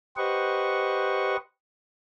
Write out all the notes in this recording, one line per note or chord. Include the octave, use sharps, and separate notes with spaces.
G4 B4 C5 D#5 F#5 C#6